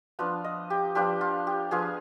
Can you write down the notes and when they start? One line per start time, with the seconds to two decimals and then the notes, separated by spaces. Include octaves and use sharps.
0.19 F3 B3 D4 F4
0.44 D#5
0.70 G4
0.95 F3 B3 D4 F4 G4
1.21 F4
1.47 G4
1.71 F3 B3 D4 F4 G#4